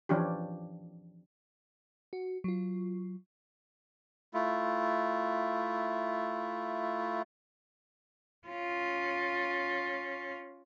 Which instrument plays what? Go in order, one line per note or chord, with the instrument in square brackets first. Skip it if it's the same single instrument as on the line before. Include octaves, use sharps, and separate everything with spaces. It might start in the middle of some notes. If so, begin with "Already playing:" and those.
[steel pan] E3 F3 C#4 D4 G4
[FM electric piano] F#4
F#3 F4
[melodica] A3 E4 F4
[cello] C#4 F4